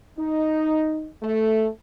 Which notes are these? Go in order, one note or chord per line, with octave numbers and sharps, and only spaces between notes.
D#4
A3